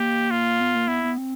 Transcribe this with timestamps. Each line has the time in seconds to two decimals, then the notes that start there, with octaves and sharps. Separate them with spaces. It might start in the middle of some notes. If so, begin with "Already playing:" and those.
Already playing: A#3 G4
0.31 F4
0.60 B3
0.75 A#3
0.88 B3 E4
1.03 B3
1.18 C4